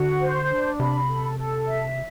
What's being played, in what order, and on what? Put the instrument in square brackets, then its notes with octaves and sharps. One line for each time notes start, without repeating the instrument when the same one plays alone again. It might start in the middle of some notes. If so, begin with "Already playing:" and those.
Already playing: [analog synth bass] D3 [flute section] F#4
[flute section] C5
D4
[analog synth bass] C3 [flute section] B5
[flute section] A4
A4
E5